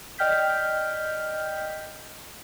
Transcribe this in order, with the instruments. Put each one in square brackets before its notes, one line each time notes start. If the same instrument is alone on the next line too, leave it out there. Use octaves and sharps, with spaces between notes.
[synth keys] D5 D#5 G5 F6 G6 B6